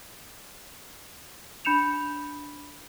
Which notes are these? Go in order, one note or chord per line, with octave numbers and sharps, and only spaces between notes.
D4 B5 G6 C#7 E7 F7